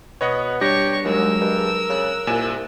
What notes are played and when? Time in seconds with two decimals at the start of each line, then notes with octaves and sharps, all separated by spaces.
0.21 B2 B3 C#5 D#5 F#5
0.61 G3 D4 G4 C#5 C#6 A#6
1.04 D#2 F#3 G#3 A#4 E6
1.41 G2
1.89 C#3 F#6
2.27 C2 A#2 G#5 E7